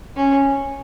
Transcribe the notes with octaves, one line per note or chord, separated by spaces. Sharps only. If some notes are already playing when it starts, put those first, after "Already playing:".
C#4